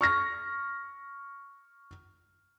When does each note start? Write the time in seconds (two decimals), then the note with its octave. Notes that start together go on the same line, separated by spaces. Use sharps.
0.01 C#6 F6 A#6